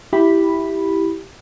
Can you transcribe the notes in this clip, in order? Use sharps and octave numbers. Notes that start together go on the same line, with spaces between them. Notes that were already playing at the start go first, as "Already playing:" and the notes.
E4 G4 B5